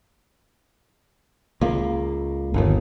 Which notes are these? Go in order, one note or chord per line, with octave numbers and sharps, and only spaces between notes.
C#2 A#3
G1 D#2